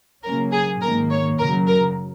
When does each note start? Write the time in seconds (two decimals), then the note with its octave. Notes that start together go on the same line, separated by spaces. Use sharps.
0.23 C#3 F#3 A#3 C#4 A#4
0.52 G#4
0.81 G#2 D#3 A#3 A#4
1.10 C#5
1.38 F#2 C#3 F#3 A#4
1.67 A#4